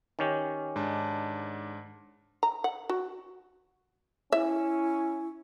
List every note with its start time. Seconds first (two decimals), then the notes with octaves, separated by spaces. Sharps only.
0.19 D#3 C#4 G4
0.76 G#2 D4 A5
2.43 A#5
2.64 F#5
2.89 F#4
4.32 C#4 E4 E5